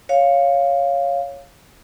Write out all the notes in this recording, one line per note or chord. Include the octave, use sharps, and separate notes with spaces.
C#5 F5